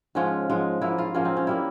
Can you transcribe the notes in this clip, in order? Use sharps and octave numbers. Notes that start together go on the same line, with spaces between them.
G#2 F3 G#3 C#4
G#2 F3 G#3
G#2 F3 A#3 E4
F4
G#2 F3 A#3 C#4
C4
C#4
G3 A#3 E4